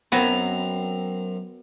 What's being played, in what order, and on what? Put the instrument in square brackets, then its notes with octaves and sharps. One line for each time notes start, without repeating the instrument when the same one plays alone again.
[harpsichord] F#2 C4 A#5 [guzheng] F#3 B3